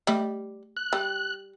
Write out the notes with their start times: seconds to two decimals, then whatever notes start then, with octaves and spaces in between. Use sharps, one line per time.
0.07 G3 A3 D#5
0.77 F#6
0.93 G3